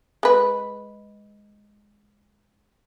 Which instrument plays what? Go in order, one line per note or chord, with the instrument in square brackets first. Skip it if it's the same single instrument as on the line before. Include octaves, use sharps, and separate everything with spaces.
[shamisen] G#3 B4